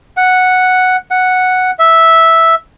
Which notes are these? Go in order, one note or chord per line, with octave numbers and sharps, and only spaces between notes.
F#5
F#5
E5